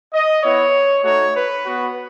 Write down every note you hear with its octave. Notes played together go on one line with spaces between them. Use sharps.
D#5
B3 E4 C#5
A3 D#4 F#4 C#5
B4
B3 F#4